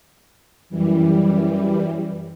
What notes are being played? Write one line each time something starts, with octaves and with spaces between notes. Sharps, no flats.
F#2 E3 G3